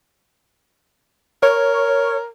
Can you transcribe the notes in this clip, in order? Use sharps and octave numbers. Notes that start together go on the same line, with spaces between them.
A#4 C#5